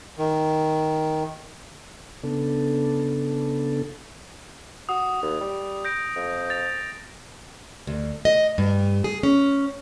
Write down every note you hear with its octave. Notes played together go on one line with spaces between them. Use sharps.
D#3
C#3 B3 D4 A4
F#4 D#6
D#2
G3
G6 A#6 D7
F2
A6 F7
D2
D#5
G2
G#4
C#4